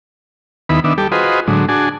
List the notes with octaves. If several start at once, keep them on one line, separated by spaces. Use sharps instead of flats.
D#2 D#3 B3 E4 B5
D#3 B3 D4 E5
G3 G4 A4
F4 F#4 G#4 B4 C5 D#5
A2 D3 F#3 G#3
D4 F#4 G#4 G#5 A5